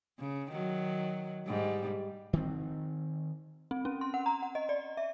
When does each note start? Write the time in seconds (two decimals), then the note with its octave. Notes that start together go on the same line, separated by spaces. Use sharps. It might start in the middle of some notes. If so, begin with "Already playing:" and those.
0.19 C#3
0.52 D#3 F#3
1.47 G#2 G3
2.33 D#3 C4
3.71 C4
3.85 C#4
4.01 C6
4.14 F#5
4.26 A#5
4.42 F#5
4.55 D#5
4.69 D5
4.97 E5